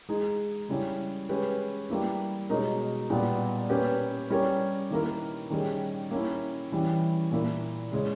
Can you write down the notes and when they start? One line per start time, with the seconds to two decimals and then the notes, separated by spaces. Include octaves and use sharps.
0.09 G#3 D#4 G#4
0.69 C#3 G3 C#4 E4
1.29 G#3 C#4 G4 B4
1.90 G3 A#3 E4
2.50 B2 G#3 D#4 A#4 C#5
3.10 A#2 G3 B3
3.70 A#3 C#4 G4 B4
4.30 G3 C#4 G4 A#4 C#5
4.91 D#3 A#3 E4 A#4
5.50 D#3 G3 C#4 G#4
6.11 A#3 C#4 E4
6.72 E3 G3 C#4 E4
7.32 A#2 A#3 E4
7.92 C#3 G#3 C#4